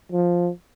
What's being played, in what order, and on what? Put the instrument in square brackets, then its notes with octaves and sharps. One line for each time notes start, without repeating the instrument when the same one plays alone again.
[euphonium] F3